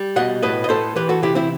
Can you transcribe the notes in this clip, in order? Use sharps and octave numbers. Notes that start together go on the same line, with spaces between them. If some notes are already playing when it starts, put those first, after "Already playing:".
Already playing: G3
B2 D#5 F#5
A2 B4 D#5
D#5
A2 A4 C5
E3 G4 B4
F#4 A4
C3 E4 G4
C4 E4